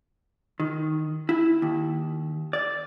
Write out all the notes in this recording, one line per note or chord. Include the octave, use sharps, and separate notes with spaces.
D#3
E4
D#2
D5